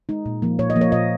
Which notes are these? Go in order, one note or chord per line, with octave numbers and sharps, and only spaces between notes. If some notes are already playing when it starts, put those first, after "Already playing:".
G#3 D#4
A#2
F3 A#3
A#2 C#5
D#5
F3 A#3
C#5
A#2 D#5